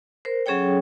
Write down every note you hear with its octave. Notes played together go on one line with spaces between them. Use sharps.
A#4 C5
F#3 C#4 G#4 A4 C#5 G5